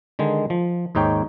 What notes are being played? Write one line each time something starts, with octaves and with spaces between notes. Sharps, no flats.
D3 D#3 G#3
F3
D#2 G#2 D#4 C#5 G5